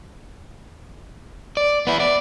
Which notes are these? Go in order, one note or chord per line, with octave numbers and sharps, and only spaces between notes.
D5
B3 E4
D5